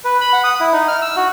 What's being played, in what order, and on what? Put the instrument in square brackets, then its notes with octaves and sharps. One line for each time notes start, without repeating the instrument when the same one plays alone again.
[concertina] B4
B5
F#5
D#6
E4
D#4
F6
E6
F#4